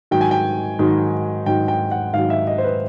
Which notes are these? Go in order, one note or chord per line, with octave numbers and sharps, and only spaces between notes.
G#2 D#3 F#3 G5
G#5
G5
G#2 D#3 F#3
G#2 D#3 F#3 G5
G5
F#5
G#2 D#3 F#3 F5
E5
D#5
C5
B4